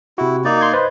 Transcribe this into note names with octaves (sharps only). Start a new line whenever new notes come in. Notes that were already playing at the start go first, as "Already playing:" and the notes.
C3 E4 F#4
A#3 D#4 D5
C6 G#6
B4 C5 D#5